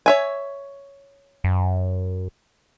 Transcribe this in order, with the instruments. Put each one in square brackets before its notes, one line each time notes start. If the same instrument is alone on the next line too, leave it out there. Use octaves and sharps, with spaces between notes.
[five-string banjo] C#5 E5 G#5
[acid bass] F#2